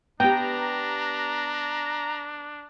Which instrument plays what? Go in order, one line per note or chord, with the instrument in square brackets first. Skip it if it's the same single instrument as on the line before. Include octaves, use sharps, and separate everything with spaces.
[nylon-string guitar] B3 G4 [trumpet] D4 [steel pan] G5 [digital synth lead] A#5